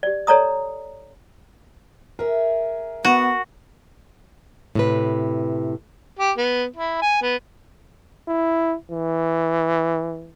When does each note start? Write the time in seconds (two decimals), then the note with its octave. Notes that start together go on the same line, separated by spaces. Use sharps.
0.03 G4 D5
0.27 A4 C#5 D5 A#5 D#6
2.19 G#4 A#4 E5
3.05 B3 F#4
4.75 A2 C3 B4
6.19 G4
6.38 B3
6.76 E4
7.02 G#5
7.22 B3
8.28 E4
8.91 E3